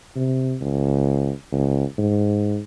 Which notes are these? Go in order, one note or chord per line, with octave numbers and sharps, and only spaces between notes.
C3
C#2
C#2
G#2